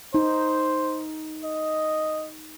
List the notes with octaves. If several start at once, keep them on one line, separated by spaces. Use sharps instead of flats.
D#4 C5
D#5